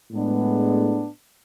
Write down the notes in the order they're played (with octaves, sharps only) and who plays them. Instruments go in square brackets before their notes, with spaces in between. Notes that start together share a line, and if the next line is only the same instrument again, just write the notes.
[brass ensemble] A2 G#3 B3 D4